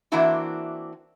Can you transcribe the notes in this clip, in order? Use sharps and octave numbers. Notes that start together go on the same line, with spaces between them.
E3 A#3 C4 D4 E4 F#4